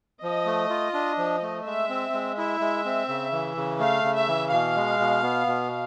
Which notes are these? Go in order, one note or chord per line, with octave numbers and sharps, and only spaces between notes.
F3 D#5
A3
F4
D4
F3
A3
G#3 E5
C4
G#3
E4 E5
G#3
C4
C#3
E3
C#3
A3 F5
C#3
E5
E3
B2 F5
G#3
B2
B3
B2